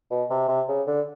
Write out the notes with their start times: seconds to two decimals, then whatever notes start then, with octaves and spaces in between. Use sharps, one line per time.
0.11 B2
0.30 C3
0.48 C3
0.68 C#3
0.87 D3